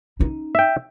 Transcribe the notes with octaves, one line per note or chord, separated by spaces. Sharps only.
C#4 D#4
E5 G5